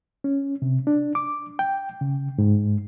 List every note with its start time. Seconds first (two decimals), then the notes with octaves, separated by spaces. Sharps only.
0.24 C#4
0.62 C3
0.87 D4
1.15 D6
1.59 G5
2.01 C#3
2.38 G#2